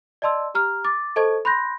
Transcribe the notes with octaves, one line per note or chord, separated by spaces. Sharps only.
D5 D#5 A5 C6 E6
G4 A#5 F6
D6 A6
A4 C5 D#5 A5 C#6 G#6
B5 C6 F#6 G6 A#6